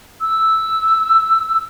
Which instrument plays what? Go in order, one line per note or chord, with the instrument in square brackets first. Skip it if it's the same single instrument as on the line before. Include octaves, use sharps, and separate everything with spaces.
[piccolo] E6